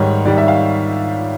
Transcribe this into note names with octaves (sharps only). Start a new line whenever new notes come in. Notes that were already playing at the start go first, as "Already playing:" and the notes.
Already playing: G#2 D#3 G3 C#5
G#2 D#3 G3 D5
E5
F5